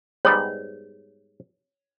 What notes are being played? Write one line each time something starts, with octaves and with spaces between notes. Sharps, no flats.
G#2 G3 B3 C#5